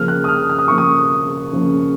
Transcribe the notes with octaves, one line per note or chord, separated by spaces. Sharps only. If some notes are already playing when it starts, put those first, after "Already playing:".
Already playing: C#3 F3 A#3 C#4 F6
F#6
D#6
F6
F6
D#6
C#3 F3 A#3 C#4 C#6
D#6
C#3 F3 A#3 C#4